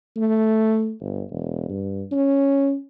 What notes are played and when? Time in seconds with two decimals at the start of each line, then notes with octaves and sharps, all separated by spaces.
0.17 A3
1.01 G1
1.31 E1
1.69 G2
2.12 C#4